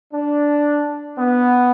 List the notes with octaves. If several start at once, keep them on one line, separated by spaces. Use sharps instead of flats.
D4
B3